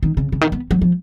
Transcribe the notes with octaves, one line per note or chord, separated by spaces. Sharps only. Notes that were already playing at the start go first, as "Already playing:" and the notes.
D#3
C#3
C#3
D#3
B3
F#3
F3